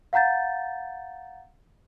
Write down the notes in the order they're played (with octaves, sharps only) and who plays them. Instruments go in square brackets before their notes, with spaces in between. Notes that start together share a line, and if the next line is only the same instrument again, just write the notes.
[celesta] F5 F#5 A#5 G6 A6